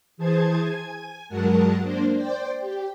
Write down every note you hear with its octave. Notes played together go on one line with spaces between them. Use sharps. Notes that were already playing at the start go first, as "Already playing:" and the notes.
E3 G#4 C5 A5 G#6
G#5 G#6
G2 F#3 G#3 A#4 F#5 A5
A#3 D4 C5
C5 D5 G5
G4